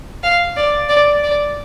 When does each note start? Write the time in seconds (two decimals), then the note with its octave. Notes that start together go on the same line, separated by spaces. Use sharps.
0.23 F5
0.56 D5
0.89 D5
1.23 D5